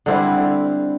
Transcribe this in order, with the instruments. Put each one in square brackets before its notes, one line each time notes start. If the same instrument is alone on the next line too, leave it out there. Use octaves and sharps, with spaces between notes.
[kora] D3 G3 C4 E4